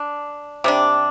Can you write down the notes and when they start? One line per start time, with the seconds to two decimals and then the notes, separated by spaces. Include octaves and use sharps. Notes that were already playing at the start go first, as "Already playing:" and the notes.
Already playing: D4
0.64 C3 G3 D4